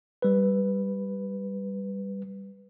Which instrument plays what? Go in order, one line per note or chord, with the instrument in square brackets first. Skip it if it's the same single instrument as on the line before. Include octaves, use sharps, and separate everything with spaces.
[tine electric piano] G3 B4